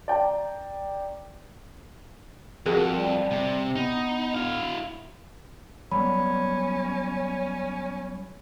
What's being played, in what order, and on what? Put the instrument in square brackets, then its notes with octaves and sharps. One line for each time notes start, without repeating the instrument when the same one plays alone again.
[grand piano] D5 G5 A#5
[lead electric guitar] F2 [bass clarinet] F#4 [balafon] G#4 A#4
[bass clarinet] G3
[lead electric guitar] C3
[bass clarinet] B3 [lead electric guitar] D#4
[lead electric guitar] E4 F5
[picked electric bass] F#3 G3 B3 [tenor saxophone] C#4 [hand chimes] B5